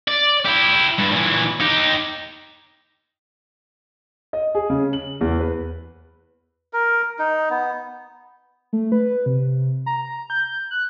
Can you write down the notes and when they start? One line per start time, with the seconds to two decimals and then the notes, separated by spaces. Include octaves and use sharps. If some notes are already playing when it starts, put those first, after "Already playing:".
0.08 D5
0.46 E4 G4
0.98 G2
1.12 A#2 E3
1.60 D#4 G4
4.33 D#5
4.55 G#4
4.70 C#3
4.93 F#7
5.21 E2
5.40 B4
6.73 A#4
7.19 D#4
7.50 B3
8.73 A3
8.92 B4
9.26 C3
9.86 A#5
10.30 G6
10.71 F#6